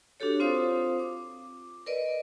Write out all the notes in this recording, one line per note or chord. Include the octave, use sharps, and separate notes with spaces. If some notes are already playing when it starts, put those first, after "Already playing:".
D4 F#4 G4 A4 C#5
C4 F4 C5 F5 D#6
D6
A#4 B4 D5 D#5